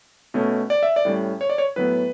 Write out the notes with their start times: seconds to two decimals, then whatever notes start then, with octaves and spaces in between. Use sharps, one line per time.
0.34 B2 A3 C#4
0.70 D5
0.83 E5
0.96 D5
1.05 A2 G3 C#4
1.41 C#5
1.50 D5
1.58 C#5
1.76 A2 F#3 B3 B4